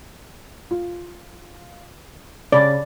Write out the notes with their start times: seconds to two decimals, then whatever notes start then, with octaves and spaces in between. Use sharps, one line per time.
0.71 F4
2.52 C#3 D5 B5